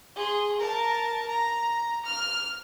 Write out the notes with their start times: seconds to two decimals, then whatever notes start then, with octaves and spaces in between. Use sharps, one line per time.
0.16 G#4 C6
0.59 A#4 A5
1.28 A#5
2.05 F6